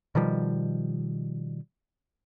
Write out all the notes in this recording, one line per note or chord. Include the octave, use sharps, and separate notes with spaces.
B2 D#3 F3 G3